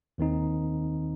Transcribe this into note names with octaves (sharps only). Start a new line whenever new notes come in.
D#2 D#3 C4 D#4